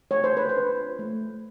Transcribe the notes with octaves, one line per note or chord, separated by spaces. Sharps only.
A3 C#5
C5
A3 B4
C5
D4
F4
A3
A3